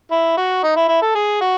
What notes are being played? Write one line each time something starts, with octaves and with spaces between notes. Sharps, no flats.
E4
F#4
D#4
E4
E4
A4
G#4
F#4